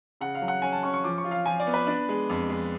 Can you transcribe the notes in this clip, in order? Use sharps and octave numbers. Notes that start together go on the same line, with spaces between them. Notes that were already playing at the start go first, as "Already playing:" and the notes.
C#3 F#5
F5
F#3
F#5
C#4 G#5
A5
C#4 C#6
C#6
F3 D6
C#6
F4
F5
F3 G#5
D5
B3
B4
D4
G#3
F2
G#3